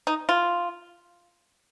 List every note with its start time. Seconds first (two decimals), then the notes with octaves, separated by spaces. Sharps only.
0.07 D#4
0.29 F4